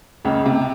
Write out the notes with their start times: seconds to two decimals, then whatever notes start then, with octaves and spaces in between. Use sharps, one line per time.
0.25 C#2 C#3
0.46 C3